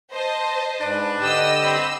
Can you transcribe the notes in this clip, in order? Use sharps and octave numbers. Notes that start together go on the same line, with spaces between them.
C5 D#5 A5
G#2 D4 B4
D3 G4 D#5 G5 E6
G2 C4 B5